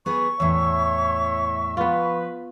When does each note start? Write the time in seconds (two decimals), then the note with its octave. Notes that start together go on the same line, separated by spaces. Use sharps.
0.06 B3 G#4 B4 C#6
0.40 E2 A2 C#5 E5
1.77 F3 B3 F4 B4